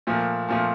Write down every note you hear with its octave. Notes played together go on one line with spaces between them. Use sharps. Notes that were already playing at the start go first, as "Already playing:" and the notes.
A#2 F3 A3
A#2 F3 A3